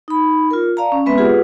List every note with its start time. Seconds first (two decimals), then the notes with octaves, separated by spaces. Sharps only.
0.08 D#4 B5
0.51 F4 A#4
0.77 D5 F5 A5 A#5
0.92 C#4
1.06 G#3 B3 C4 B4 E5
1.18 F4 G4 G#4 B4 F#5